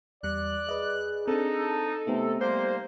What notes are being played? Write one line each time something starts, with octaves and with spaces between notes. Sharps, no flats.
E2 G3 D5 F#6
G#4 B4 D#5
C4 D4 D#4 A4
C3 A3 B3 D#4
G3 A#3 C5